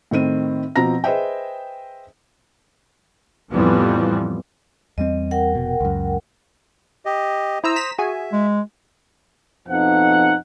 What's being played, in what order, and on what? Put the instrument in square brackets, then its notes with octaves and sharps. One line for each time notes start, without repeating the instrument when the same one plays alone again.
[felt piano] A2 D#3 C4 D#7
B2 F3 C4 A#5 A#6
G#4 B4 C5 D#5 E5 G5
[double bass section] F2 A2 E3 F3 G3 B3
[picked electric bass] E2 G3 C4 [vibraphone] D#5
[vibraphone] A#4 F#5 G5
[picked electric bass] F1 B2
C#2 F#2
[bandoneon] G4 D#5
[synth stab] E4 A#5 E6 [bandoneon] C5 D#6
[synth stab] A#5 B6 E7
[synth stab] F#4 G#4 G#5 [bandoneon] E5
[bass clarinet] G#3
[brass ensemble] F2 B2 F3 D#4 F#5